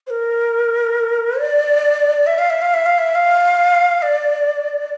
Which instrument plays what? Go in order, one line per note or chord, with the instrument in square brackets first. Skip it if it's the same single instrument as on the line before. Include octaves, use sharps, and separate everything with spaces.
[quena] C5
A#4
D5
E5
F5
E5
F5
E5
F5
E5
F5
D5